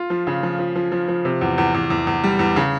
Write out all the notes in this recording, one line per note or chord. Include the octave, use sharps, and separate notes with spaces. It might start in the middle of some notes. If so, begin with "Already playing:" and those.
Already playing: F4
F3
C#3
F3
F3
F3
F3
F3
C3
E2
E2
E2
E2
E2
G3
E2
C#3